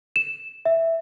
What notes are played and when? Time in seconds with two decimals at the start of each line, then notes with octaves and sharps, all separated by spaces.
0.16 E7
0.65 E5